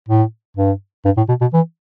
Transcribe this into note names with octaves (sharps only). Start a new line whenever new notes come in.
A2
G2
G2
A2
B2
B2
E3